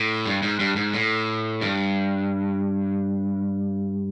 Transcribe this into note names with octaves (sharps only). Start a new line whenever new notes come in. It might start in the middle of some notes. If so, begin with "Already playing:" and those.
Already playing: A2
G2
G#2
G2
G#2
A2
G2